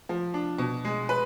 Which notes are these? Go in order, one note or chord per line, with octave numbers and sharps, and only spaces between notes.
F3
D4
B2
G#3
B4